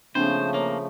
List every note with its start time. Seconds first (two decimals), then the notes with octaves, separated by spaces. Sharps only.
0.15 C#3 F3 A3 A#3 C4 D4 C5
0.54 A#3 C#5 A#5